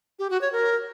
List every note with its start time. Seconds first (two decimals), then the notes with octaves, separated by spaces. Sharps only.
0.19 G4
0.30 F#4
0.41 C#5
0.52 A#4